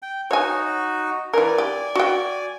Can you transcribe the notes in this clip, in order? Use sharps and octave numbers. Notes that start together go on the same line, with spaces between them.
G5
D#4 F#4 C#5 G#5
E3 A#4 D5 G#5
G4
F#4 G5